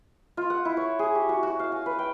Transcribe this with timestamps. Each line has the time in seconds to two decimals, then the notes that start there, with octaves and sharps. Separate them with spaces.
0.37 F4
0.50 F#5
0.65 E4
0.77 C#5
0.99 G#4
1.15 G4
1.29 F#4
1.43 F#4
1.59 F5
1.72 G#5
1.86 B4
1.99 G5